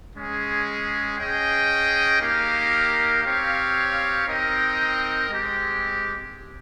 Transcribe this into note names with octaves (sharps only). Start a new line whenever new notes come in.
G#3 C#4 G#4
C#4 G#4 D#5 G5
A#3 D#4 G4 A#4 F5
C4 G4 C#5 F5
C4 D#4 A#4 D#5 G5
G#3 C4 G4